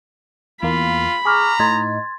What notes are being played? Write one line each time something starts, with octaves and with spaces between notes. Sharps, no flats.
E2 A#3 F4 B5
G#4 A#5 C#6 D6 F6
A2 D#4 C6 G#6 A6